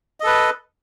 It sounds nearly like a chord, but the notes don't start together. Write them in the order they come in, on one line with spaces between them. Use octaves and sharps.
D#5 A4 B4